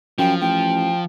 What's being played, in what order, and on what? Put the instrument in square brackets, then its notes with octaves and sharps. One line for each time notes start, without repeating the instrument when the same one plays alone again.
[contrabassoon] F#2 [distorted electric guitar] F3 [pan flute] G5
[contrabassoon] A1 [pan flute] G5